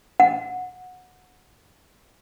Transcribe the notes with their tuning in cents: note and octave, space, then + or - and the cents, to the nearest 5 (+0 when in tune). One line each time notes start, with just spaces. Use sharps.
F#5 -20